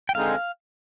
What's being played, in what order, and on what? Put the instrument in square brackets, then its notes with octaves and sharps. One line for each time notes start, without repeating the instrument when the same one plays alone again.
[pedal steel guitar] G5
[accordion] D3 G#3 C4 D#4 G#4 [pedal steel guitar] F5